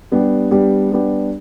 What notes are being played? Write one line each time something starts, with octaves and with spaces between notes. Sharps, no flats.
G3 B3 D4 G4
G3 B3 D4 G4
G3 B3 D4 G4